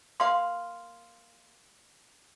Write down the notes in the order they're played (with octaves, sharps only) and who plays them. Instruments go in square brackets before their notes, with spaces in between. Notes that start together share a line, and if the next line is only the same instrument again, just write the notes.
[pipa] A#3 F5 [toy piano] C6